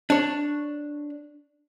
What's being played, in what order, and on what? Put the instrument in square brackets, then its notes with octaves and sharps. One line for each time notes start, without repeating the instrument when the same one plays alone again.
[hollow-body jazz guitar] D4 C#5